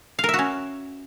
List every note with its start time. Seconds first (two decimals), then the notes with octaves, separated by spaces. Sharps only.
0.19 F5
0.24 A#4
0.29 E5
0.34 F#4
0.39 C#4